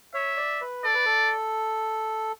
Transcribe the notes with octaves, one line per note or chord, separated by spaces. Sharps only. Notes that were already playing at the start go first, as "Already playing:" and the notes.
C#5 E5
D5
B4
A4 D5
B4
A4